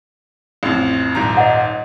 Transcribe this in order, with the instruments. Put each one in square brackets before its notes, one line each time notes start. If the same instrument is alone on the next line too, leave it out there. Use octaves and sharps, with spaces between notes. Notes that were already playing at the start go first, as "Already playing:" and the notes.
[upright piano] A1 F2
D#1 G#2 A#5
[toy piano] D#5 F#5